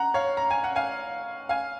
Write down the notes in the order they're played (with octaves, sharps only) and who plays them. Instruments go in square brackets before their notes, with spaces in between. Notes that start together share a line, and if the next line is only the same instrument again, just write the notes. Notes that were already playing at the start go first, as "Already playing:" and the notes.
Already playing: [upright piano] F#5 A#5
C#5 F5
A#5
G#5
F#5
F5 G#5
F5 G#5